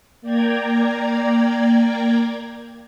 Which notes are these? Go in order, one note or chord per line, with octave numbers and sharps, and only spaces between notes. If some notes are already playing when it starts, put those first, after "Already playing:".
A#3 D5 G5 A#5 G#6